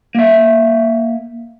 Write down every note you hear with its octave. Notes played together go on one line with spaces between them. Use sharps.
A#3 E5